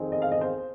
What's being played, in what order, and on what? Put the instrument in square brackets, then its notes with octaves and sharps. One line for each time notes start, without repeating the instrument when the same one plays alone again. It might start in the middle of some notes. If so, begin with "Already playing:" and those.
Already playing: [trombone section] F2 D#3 C4 D#4 G#4
[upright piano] D#5
F5
D#5
C5